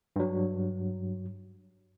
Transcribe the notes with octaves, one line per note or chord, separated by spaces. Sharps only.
G2 F#3